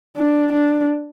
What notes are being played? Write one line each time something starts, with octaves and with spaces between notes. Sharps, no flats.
D4
D4